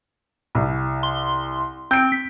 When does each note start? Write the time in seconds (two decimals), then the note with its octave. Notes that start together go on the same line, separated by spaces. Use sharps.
0.55 C2
1.03 C6
1.91 C4 G6 D7
2.12 B6